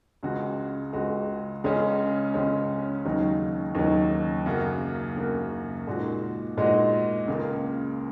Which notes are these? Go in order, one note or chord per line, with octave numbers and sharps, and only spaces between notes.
C#2 C#3 G#3 F#4
C#2 C#3 G#3 F#4
C#2 C#3 G#3 C#4
C#2 C#3 G#3 C#4
D#2 C#3 F#3 D#4
D#2 C#3 F#3 D#4
F#2 C#3 A#3 F#4
F#2 C#3 A#3 F#4
A#2 G#3 D#4 F#4
A#2 G#3 D#4 F#4
C#2 C#3 A#3